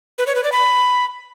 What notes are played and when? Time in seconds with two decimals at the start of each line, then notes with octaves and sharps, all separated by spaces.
0.18 B4
0.27 C#5
0.35 B4
0.44 D5
0.52 B5